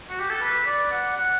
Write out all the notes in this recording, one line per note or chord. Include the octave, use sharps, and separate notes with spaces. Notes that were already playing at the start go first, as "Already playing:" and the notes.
F#4
G4
A4
B4
D5
F#5
F#5